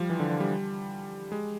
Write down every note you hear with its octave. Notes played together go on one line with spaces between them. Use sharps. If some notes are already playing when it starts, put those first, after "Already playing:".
Already playing: F3 G3
E3
D3
D3
G3
G#3